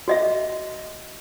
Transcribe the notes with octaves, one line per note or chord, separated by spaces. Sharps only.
F#4 D#5 E5